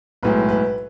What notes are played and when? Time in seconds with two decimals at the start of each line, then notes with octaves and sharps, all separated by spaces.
0.23 B1 A2 G#3 B4
0.49 B4